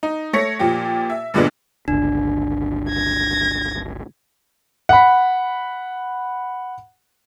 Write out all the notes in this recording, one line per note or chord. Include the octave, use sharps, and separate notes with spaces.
D#4
A3 C#5 A#6 C#7
A#2 F3 G4
E5
G2 A#2 D3 G#3 B3 D4
G1 C#2 D4
G#6 A#6
F#5 B5